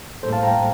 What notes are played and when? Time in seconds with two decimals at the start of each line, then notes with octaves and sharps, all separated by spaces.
0.23 A2 G3 A#3 A4 C5
0.33 F5 A5
0.43 G5 A#5